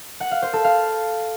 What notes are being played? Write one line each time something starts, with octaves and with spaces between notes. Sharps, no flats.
F#5
F5
C5
A4
F5